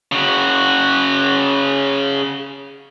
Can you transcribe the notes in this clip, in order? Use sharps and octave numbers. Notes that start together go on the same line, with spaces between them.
C#3 F#4